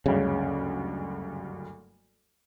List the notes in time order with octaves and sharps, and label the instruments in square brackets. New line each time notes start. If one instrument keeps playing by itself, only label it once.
[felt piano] F#1 D2 G2 [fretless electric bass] C#3